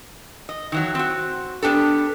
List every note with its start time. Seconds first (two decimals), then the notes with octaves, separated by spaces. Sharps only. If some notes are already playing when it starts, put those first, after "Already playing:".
0.49 D#5
0.72 D#3 E3 F#3
0.95 C4 F#4
1.62 B3 D4 G4 A4